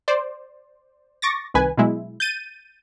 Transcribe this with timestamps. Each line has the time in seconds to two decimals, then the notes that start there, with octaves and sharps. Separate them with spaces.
0.08 C5 D5
1.22 C#6 D6 A6 A#6
1.54 C2 D#3 B4 G#5
1.77 B2 F#3 G#3 E4
2.20 G6 A6 D#7